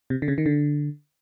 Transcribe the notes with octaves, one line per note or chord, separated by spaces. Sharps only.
C3
D3
C#3
D#3
D3